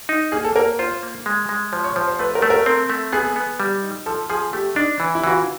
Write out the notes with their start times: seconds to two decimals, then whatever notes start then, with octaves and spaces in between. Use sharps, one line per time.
0.09 D#4
0.32 A#3 G#4
0.44 A4
0.56 A#3 A#4
0.79 F4 C5
1.03 A#3
1.26 G#3
1.49 G#3
1.72 F3 C5
1.84 C#5
1.96 F3 C5
2.08 C5
2.19 A3 B4
2.35 A#4
2.42 A3
2.50 A#4
2.66 C4
2.90 A3
3.13 B3 G#4
3.36 B3
3.60 G3
3.83 D#4
4.06 F3 A4
4.30 F3 G#4
4.53 A3 G4
4.76 D4 D#4
5.00 E3
5.15 E4
5.24 E3 F#4
5.31 F4